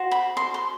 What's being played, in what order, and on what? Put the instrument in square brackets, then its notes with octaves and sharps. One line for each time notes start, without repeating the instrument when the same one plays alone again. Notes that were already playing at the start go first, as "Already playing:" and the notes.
Already playing: [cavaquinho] F#4 C5
B5
C6
C6